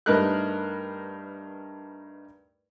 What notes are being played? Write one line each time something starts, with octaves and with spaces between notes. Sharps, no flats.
G2 A3 D#4 A#4 B4 F#6